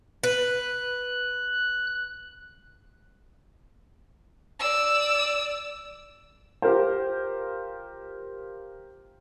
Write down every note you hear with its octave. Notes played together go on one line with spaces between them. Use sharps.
B4 F#6
D5 E6
F4 G4 A#4 C5